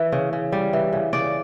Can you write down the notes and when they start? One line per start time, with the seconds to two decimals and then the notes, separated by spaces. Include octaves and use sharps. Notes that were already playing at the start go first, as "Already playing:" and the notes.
Already playing: E3
0.12 C#3
0.33 C#3
0.52 G3
0.73 E3
0.93 C#3
1.13 C#3 D5